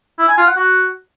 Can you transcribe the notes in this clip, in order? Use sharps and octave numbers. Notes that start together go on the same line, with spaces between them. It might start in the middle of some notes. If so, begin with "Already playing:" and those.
E4
G#5
F4
F#5
F#4